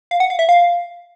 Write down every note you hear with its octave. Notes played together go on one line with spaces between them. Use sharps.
F5
F#5
F5
E5
F5